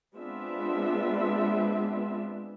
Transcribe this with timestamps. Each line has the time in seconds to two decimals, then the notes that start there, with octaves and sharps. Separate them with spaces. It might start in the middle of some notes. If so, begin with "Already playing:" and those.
0.15 G#3 B3 C4 D4 F4 E5